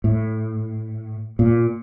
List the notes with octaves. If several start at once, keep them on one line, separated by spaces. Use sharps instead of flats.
A2
A#2